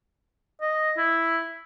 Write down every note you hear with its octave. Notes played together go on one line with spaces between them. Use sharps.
D#5
E4